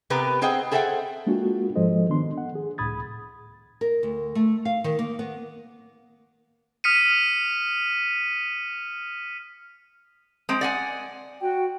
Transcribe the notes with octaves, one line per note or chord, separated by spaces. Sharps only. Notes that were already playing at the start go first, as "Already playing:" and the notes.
C3 B3 G4 A#4 B4
C4 G#4 C5 D#5 F#5 G5
G#4 A4 C5 E5 F#5 G5
G#3 A#3 D4 F4 F#4
G#2 F3 G#3 A4 C5 D#5
D#3 B3 D4 C6
F#5
G#4
C#2 A2 B5 D#6 G#6 A6
A#4
D2
A3
F5
D#3
A#3
B3
D#6 F6 B6 C#7 D#7
G#3 C4
D5 F#5 G#5
F#4 G5